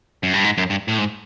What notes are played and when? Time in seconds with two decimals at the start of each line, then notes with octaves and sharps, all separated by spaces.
0.23 F#2
0.34 G2
0.44 G#2
0.58 F#2
0.70 G2
0.88 A2
0.98 G#2